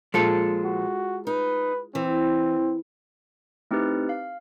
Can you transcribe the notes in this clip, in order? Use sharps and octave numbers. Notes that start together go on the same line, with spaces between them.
A#2 F3 G#3 F4 A4
F#4
D#4 B4
E3 C4
A3 C4 D#4 E4 G4 B4
F5